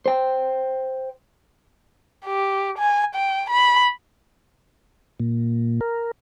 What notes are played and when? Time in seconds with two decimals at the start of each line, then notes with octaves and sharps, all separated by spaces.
0.06 C5 G5
2.26 G4
2.79 G#5
3.15 G5
3.50 B5
5.20 A#2
5.81 A#4